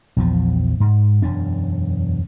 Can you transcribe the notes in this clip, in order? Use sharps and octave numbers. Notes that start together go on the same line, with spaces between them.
A#1 E2 F3
G#2
E1 F#2 C#4 D4